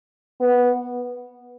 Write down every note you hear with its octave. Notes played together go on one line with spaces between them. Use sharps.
B3